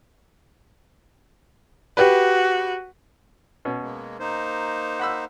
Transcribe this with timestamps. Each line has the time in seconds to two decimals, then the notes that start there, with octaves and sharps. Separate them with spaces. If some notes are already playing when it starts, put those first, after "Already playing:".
1.97 F#4 G4 B4
3.65 B2 C#4
3.82 G#3 A#3
4.19 A#3 D#4 C5
5.00 F#5 B5 E6